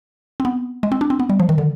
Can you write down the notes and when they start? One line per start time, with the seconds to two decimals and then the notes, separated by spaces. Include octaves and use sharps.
0.40 C4
0.45 B3
0.83 G#3
0.92 C4
1.01 D4
1.10 C4
1.20 B3
1.30 G3
1.40 F3
1.49 D#3
1.58 D3